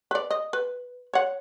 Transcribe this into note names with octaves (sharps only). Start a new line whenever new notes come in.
B4 D5
D#5
B4
C#5 F#5